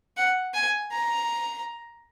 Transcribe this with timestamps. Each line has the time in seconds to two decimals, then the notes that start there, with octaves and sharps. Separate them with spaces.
0.17 F#5
0.54 G#5
0.92 A#5